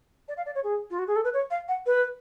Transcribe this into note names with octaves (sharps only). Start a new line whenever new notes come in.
D5
F5
D5
C#5
G#4
F4
F#4
G#4
A4
B4
C#5
F5
F#5
B4